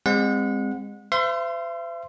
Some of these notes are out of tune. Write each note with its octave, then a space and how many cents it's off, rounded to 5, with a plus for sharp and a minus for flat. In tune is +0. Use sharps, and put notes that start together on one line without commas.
G#3 -30 C4 +0 F#5 -30
C5 -40 E5 +45 C6 +0